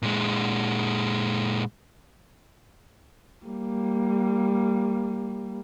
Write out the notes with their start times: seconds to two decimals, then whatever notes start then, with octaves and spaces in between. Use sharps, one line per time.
0.02 A#2 G#3
3.46 G3 A#3